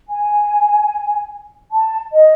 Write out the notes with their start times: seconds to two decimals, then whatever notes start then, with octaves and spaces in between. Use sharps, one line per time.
0.08 G#5
1.72 A5
2.13 D#5